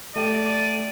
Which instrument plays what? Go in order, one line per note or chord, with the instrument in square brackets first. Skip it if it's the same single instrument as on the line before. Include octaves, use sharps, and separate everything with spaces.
[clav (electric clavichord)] A3 G4 [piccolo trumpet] D5 [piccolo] D#7